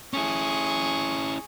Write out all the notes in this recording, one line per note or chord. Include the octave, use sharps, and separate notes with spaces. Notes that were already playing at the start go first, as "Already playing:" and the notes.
C#4 E4 G#4 C#6